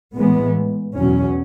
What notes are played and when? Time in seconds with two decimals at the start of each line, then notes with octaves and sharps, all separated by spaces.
0.15 A2 E3 G#3 B3
0.97 E2 B2 F#3 C#4